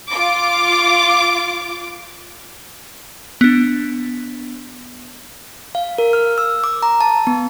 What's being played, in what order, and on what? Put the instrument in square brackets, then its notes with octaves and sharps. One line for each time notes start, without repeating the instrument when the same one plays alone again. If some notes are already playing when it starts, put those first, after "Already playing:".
[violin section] F4 D6
[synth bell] B3 D4
[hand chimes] F5
A#4
F6
E6
D6
A#5
A5
B3